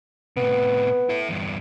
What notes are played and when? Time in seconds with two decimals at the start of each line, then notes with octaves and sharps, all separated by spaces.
0.37 A2 C3 B3
1.09 E4 A4
1.29 E2 G2